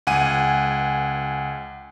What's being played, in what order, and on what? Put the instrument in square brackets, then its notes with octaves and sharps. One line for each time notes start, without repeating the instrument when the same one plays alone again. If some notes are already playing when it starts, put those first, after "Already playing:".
[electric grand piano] C#2 F#5 G#5 D#7